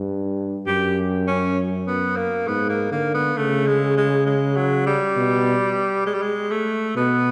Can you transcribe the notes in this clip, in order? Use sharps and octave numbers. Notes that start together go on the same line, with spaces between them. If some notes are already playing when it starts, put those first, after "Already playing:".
Already playing: G2
F#2 G4
C#4
B3
A#3
G#2 B3
A#3
D3 A#3
B3
C#3 A3
G#3
G#3
G#3
F#3
G3
B2
G#3
G3
G#3
A3
B2 B3